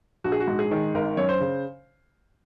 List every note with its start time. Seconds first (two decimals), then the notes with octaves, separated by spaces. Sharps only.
0.24 A#1 F#4
0.32 G#4
0.40 F#4
0.48 G#2
0.59 G#4
0.71 D#3
0.95 G#1 A#4
1.17 F#2 C#5
1.29 C5
1.40 C#3